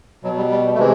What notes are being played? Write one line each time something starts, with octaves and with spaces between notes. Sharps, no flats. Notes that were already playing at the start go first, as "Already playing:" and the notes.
B2 F#3
G3
G3
G3
A3
C3 E3 G#3